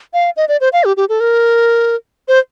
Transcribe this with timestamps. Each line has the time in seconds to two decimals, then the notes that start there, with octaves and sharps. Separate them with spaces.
0.13 F5
0.37 D#5
0.49 D5
0.61 C5
0.73 F5
0.84 G4
0.97 G4
1.09 A4
1.20 A#4
2.28 C5